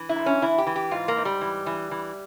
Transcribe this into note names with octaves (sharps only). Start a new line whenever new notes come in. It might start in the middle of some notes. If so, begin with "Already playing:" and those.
Already playing: E3
E4
G#2
C#4
E3 E4
G4
E3
G4
G#2 F4
A#3
G#2
G3
E3
E3
E3